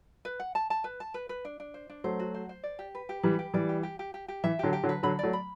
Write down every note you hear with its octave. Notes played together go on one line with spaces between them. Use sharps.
B4
F#5
A5
A5
B4
A5
B4
B4
D4
D4
C5
D4
F#3 A3 C5
F#4
C5
C5
D5
G4
B4
G4
E3 G3 B4
G4
E3 G3 D5
G4
G4
G4
G4
G4
E3 E5
D3 F#3 G4
G4
D3 F#3
B4
D3 F#3 B5
F#3 A3 D5
B5